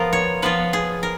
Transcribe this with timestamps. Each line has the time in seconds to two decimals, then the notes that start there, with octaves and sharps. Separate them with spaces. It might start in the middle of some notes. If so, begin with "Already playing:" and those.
Already playing: F3 B3 F4 A#4
0.13 C#5
0.42 F3 B3 F4 B4
0.73 G#4
1.03 A#4